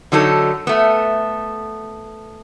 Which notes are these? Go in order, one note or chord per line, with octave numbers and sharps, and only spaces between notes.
D3 F#3 D#4 G#4 A4
A3 B3